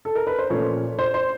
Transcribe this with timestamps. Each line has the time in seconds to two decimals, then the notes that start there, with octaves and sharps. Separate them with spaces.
0.05 A4
0.15 A#4
0.27 B4
0.39 C5
0.50 A#2 F3 A3 C#4 C#5
0.99 C5
1.14 C5